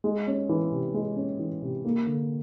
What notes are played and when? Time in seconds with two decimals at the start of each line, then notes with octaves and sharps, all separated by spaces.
0.04 G#3
0.27 C#4
0.49 E3
0.72 C3
0.94 G#3
1.16 C#4
1.39 E3
1.62 C3
1.85 A#3
2.07 D3